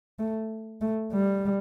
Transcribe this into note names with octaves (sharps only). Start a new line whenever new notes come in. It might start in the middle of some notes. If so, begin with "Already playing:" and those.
A3
A3
G3